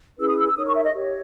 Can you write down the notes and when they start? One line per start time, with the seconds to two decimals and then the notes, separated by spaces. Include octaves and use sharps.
0.18 C#4 E4 G#4 B4 E6
0.28 D#6
0.36 E6
0.47 E6
0.55 D#4 A#4 C#5 D#6
0.65 C#6
0.74 E5
0.85 D#5
0.94 G4 C#5